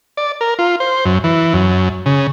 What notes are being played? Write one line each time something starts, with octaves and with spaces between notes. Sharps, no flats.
D5
A#4
F4
C5
F#2
E3
F#2
C#3